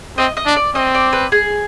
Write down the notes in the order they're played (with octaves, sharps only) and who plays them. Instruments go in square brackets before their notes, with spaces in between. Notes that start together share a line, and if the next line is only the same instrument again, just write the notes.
[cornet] C4 [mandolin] D#5
[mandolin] D#5
[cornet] D4
[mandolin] D5
[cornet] C4 [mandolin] D#5
[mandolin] D5
B4
G#4